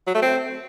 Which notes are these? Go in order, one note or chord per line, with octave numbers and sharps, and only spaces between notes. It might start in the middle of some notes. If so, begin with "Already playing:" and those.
F#3
A3
C4